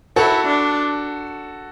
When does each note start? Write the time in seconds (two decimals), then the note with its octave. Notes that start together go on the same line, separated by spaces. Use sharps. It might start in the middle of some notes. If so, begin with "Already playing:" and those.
0.16 E4 F#4 A4
0.46 D4